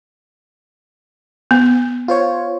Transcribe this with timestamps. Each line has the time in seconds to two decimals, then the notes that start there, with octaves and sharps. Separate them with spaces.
1.51 B3
2.08 F4 C5 C#5